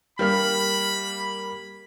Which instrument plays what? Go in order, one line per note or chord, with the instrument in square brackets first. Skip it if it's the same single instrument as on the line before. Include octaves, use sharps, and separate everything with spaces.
[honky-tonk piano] G3 A#3 F6 [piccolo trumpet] B5